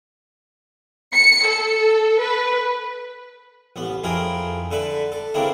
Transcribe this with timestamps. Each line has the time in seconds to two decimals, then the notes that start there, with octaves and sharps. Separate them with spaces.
1.14 C#7
1.46 A4
2.20 B4
3.76 A1 B3
4.04 F2 E4 G#4 A#4 G5
4.71 D3 A4 B4 E5
5.12 A4
5.34 C#3 C4 D4 E4 A#4